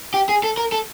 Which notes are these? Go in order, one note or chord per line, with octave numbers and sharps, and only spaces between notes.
G4
G#4
A4
A#4
A4